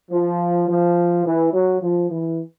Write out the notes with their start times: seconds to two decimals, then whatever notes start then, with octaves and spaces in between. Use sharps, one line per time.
0.11 F3
0.69 F3
1.25 E3
1.53 F#3
1.81 F3
2.11 E3